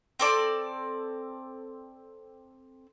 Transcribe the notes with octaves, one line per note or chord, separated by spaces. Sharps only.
C4 A4 D5